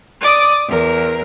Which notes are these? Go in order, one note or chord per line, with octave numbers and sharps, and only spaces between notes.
D5 D6 D#6
E2 A#4